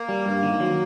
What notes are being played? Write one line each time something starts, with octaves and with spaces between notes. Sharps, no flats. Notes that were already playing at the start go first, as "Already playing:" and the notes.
Already playing: A#3
G3
G2
D#3
F#3